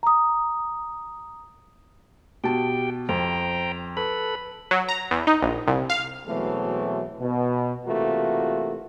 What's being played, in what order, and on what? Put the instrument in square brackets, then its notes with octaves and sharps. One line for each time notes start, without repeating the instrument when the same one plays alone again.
[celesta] A#5 D#6
[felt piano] B2 A5 [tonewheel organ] G4 G5
[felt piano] F2 [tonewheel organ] C5 G5 A#5
[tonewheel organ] A4 B4 B5
[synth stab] F#3
A#5
E2
D#4
A#1
C2
F5
[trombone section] B2 E3 F#3 G#3 A3 C4
B2
C3 E3 A3 A#3 F4 F#4